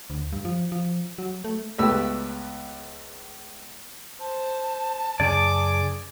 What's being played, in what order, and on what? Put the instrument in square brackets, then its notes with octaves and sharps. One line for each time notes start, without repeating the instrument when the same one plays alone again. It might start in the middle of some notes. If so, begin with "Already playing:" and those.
[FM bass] D2
G2
F3
F3
F#3
A3
[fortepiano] C#2 A3 B3 G4 E6
[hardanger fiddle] C5 [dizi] A5
[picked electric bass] F#2 C#3 [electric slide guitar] G#4 D5 [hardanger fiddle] D6